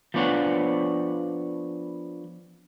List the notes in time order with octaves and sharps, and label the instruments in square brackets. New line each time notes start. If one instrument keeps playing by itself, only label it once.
[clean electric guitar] F3 B3 D4 C#5 F#5